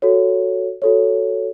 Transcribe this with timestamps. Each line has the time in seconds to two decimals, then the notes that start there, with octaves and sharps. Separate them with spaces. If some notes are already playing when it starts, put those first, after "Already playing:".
0.02 F#4 A4 C#5
0.82 F#4 A4 C#5